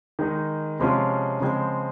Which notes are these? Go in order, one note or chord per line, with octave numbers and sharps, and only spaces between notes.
D#3 G#3 D#4
C3 F3 G#3 C#4 F4
C#3 F3 G#3 C4